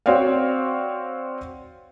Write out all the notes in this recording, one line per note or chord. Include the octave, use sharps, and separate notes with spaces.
C4 F#4 C#5 D5 F5